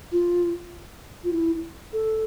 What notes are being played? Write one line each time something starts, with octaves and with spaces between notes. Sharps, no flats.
F4
F4
E4
A4